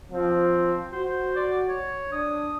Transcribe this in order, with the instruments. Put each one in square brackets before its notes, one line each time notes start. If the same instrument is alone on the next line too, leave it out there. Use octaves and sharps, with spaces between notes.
[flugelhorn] F3 [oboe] C4
[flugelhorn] F#4 [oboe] C5
[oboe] D5
C#5
[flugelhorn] D4 [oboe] D#6